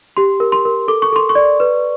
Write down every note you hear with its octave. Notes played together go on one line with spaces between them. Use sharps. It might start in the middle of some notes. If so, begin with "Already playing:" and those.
G4 C6
A#4
C6
A#4
A4 D6
C#6
A4 C6
C#6
D5
B4